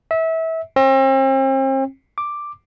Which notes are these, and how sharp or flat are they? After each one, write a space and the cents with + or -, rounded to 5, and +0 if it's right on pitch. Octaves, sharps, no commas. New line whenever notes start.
E5 -25
C4 +40
D6 +5